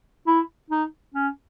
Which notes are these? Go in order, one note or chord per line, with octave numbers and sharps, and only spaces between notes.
E4
D#4
C#4